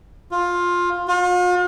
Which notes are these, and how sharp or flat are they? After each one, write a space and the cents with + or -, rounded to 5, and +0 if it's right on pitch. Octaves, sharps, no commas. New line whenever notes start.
F4 +15
F4 +45